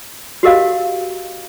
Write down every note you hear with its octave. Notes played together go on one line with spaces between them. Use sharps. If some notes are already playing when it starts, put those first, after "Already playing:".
F#4 G4 A#4 D#5 F5